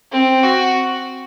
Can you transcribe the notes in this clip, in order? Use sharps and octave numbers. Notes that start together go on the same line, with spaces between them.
C4
F#4